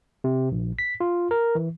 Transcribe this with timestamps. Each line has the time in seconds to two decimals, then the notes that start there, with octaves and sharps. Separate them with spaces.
0.24 C3
0.52 A#1
0.79 B6
1.00 F4
1.31 A#4
1.55 E3